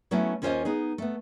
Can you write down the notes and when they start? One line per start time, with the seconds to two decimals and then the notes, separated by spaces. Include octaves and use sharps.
0.11 F#3 A3 B3 C#4 E4 F#4
0.42 D#2 C#4 F4 C5 C#5 D#5
0.65 B3 D#4 G#4
0.98 A3 B3